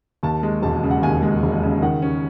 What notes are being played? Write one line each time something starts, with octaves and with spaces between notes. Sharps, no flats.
D#2 A5
G#3
E1 A5
C#3
F#5
D#2 G#5
G#3
E1
C#3
D#3 F#5
C#4